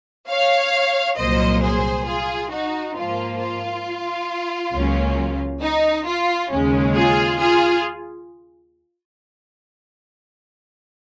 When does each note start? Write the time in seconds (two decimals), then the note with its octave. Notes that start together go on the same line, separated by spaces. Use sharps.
0.29 C#5 F5
1.17 C2 A#2 F#3 A#3 C5 D#5
1.62 G#4 C5
2.06 F4 G#4
2.51 D#4 F#4
2.95 G#2 F3 A#3 F4
3.40 F4
4.73 C#2 C#3 F#3 A#3 C#4
5.62 D#4
6.06 F4
6.50 D#2 C#3 G#3 C#4
6.95 F4 G#4
7.39 F4 G#4